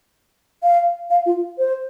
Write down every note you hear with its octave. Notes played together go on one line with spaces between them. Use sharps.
F5
F5
F4
C5